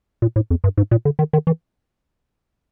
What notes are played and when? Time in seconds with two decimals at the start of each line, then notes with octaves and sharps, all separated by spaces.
0.22 A#2
0.36 A2
0.50 F2
0.64 G2
0.77 G#2
0.91 A#2
1.05 D3
1.19 D#3
1.33 D#3
1.47 E3